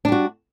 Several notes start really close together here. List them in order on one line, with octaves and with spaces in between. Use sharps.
D4 G3 F#4